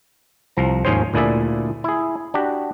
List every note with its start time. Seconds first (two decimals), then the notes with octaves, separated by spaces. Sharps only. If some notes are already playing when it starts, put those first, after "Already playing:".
0.57 C2 F3 A#5
0.85 D#2 G#2 F3 C#4 G#4 C5
1.14 D2 A#2 E4 G#4 D5 E5
1.84 E4 G#4
2.34 D4 F#4 G4